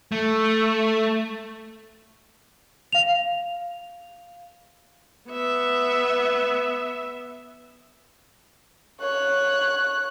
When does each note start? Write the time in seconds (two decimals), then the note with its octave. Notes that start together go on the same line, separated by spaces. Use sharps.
0.12 A3
2.93 F5 F7
5.30 B3 E5
9.00 C#5 F#6